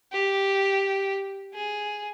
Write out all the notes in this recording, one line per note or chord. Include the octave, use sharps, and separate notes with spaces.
G4
G#4